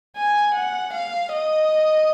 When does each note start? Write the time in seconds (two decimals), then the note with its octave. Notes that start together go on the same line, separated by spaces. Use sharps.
0.16 G#5
0.55 F#5
0.94 F5
1.33 D#5